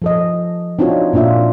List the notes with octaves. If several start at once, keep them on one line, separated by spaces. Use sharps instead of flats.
F3 A4 D#5
C4 D4 D#4 F4 F#4 C#5
A#2 C4 D4 F4 E5